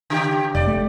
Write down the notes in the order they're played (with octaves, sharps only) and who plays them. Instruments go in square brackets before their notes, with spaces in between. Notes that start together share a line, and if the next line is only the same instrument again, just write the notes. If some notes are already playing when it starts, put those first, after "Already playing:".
[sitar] C#3 G4
[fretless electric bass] F1 [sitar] D5
[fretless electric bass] A3